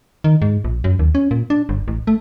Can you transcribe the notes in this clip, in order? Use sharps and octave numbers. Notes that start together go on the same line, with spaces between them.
D#3
G#2
A#1
F#2
D#2
C#4
A#2
D4
G1
A1
A3